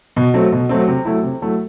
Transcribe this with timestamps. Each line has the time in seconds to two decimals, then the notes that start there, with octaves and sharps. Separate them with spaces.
0.16 B2
0.34 F#3 A3 C4
0.52 B2
0.69 F#3 A3 C4
0.88 C3
1.05 F#3 A3 E4
1.23 C3
1.42 F#3 A3 E4